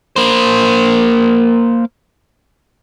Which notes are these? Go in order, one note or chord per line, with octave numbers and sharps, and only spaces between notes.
A#3 C5